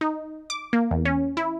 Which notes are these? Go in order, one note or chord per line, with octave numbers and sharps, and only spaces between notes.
D#4
D6
A#3
E2
C#4
E4